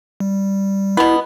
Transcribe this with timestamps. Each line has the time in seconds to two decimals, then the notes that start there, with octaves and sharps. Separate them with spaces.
0.20 G3
0.97 B2 B3 E4